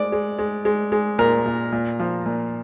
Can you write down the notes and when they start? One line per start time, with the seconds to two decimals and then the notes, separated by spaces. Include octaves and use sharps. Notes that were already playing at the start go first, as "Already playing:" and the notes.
Already playing: G#3 D5
0.12 G#3
0.39 G#3
0.65 G#3
0.92 G#3
1.19 A#2 A#4
1.46 A#2
1.72 A#2
2.00 F3
2.26 A#2